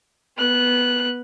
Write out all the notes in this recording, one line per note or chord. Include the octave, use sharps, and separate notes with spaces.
B3 F#6